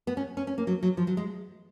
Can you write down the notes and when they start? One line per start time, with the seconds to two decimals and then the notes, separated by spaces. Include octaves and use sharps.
0.07 B3
0.17 C#4
0.37 C#4
0.47 C#4
0.58 A#3
0.67 F#3
0.83 F#3
0.97 F3
1.07 F#3
1.17 G#3